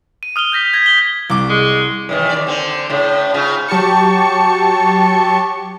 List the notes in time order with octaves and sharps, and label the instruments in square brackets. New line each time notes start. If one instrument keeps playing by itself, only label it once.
[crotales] D#7
D#6 F6 F7 G7
F6 G6 A#6 B6
G#6 A#6 B6
G7
[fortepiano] C2 D6
[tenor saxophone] G#3
[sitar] F#2 D#3 E3
D#2 D5
D3 C4
A2 C#3
G#2 C#3 F4
[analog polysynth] F#3 G4 A5 C#6 C#7